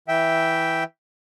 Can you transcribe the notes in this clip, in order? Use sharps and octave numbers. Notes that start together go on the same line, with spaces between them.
E3 E5 G5